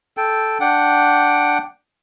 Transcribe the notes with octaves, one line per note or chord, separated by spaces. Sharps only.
A4 G5
D4 F#5 G5